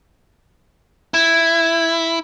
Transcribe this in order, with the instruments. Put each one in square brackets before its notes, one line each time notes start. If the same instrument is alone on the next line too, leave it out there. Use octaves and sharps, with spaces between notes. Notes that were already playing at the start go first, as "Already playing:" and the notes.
[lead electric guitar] E4 [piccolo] G#6